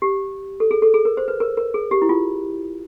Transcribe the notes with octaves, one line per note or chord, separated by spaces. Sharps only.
G4
A4
G#4
A4
G#4
A#4
C5
B4
A#4
A#4
G#4
G4
E4
F4